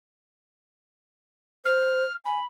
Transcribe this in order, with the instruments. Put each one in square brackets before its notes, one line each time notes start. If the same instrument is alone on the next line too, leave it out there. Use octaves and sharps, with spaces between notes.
[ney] C5 [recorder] F6
[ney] G#5 [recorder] B5